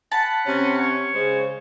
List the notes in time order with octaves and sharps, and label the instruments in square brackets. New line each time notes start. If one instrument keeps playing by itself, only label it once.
[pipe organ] F#5 B5 F#6 [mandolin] A5
[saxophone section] C3 C#4
[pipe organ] C#5 C#6
[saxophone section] C#3 G#3 C5